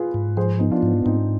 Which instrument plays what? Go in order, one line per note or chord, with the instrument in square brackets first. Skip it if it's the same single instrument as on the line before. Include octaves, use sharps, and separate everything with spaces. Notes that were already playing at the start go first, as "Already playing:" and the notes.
Already playing: [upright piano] F4 G#4 B4
[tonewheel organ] G#2
[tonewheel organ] F3 [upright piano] G#4 C5
[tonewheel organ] B3 [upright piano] D#4
[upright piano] D4 F4
[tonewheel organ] G#2
[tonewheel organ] G#2 [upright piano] C4 D#4